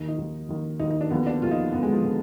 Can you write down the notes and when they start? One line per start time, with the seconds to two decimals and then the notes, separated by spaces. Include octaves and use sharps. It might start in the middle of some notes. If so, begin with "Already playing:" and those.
Already playing: D#2 D#3
0.08 D#4
0.18 D#2 D#3
0.49 D#2 D#3
0.80 D#2 D#3 D#4
0.90 D#4
1.01 D4
1.11 D#2 D3 F3 B3
1.27 D4
1.42 D#2 D3 F3 F4
1.51 D#4
1.72 D#2 D3 F3 B3
1.83 G#3
1.93 F3
2.04 D3 F3